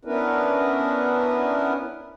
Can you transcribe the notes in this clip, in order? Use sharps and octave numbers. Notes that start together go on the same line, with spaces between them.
B3 C#4 D4 E4 A#4 B4